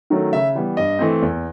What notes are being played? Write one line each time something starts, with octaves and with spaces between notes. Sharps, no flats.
D#3 F#3 A3 C#4
C#3 E5
E3 G3 B3
G2 D#5
E3 A3 C4
E2